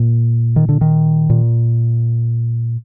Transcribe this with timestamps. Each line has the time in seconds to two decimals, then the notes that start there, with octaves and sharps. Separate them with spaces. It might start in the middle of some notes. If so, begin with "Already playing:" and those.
Already playing: A#2
0.56 D#3
0.69 D3
0.81 D#3
1.30 A#2